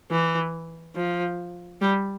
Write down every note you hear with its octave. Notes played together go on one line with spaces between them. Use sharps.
E3
F3
G3